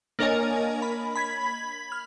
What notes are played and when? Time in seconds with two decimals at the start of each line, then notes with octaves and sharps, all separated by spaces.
0.19 A#3 D4 A#4 C#5 D#5 G#5
0.82 B5
1.16 B5 G#6 B6
1.92 F6